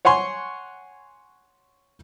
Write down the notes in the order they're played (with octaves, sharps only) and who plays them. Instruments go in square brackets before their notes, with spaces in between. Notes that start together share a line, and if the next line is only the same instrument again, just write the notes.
[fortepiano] C#5 F#5 G#5 C6 C#6